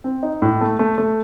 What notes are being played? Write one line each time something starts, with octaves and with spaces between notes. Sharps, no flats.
C4
D#4
A2
A3
A3
A3